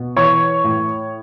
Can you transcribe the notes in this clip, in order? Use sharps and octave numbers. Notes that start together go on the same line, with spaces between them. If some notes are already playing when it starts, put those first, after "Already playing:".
Already playing: B2
E3 C#5 C#6
A2